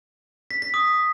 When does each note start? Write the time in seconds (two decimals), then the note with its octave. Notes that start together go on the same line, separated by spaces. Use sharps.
0.51 B6
0.62 B6
0.74 D#6